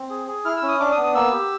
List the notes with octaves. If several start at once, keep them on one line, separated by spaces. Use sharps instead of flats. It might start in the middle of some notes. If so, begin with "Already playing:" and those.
Already playing: C4
G#4
G#4
E4 F6
E6
C#4
D#6
D4 D6
D#6
B3
D#6
A#3 E6
G4